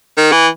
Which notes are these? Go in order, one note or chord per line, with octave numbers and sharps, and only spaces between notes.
D#3
E3